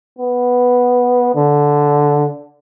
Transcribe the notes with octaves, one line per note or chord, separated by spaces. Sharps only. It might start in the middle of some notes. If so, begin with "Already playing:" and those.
B3
D3